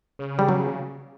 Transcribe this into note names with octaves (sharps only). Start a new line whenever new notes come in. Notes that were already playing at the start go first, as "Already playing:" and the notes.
C#3
G3
F#3